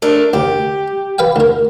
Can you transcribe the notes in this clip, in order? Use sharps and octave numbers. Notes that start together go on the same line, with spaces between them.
A3 D4 A#4
D2 G4
B4 F5 G5
D2 A#4